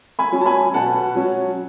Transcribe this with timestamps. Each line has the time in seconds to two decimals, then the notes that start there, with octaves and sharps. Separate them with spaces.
0.19 G#5 B5
0.32 F#3 C#4
0.41 A5
0.46 G#5 B5
0.74 B2 F#5 A5
1.15 F#3 C#4